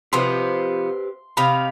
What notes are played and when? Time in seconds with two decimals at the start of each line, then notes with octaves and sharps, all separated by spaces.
0.13 C3 F3 B3 G4 B4 C5 C6
1.37 C3 D#4 F5 B5